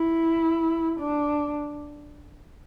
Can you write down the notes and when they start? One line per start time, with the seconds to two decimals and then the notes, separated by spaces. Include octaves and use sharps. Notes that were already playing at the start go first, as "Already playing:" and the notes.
Already playing: E4
1.00 D4